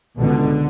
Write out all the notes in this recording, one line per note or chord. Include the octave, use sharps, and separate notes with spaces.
C#2 B2 D3